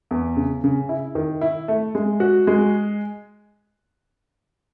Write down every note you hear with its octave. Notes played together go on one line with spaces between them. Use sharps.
E2
C#3
C#3
E4
D#3
E4
A3
G#3
F#4
G#3